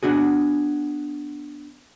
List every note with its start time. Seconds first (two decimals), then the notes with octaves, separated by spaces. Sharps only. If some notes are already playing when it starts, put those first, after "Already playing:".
0.03 B3 D4 F#4 G#4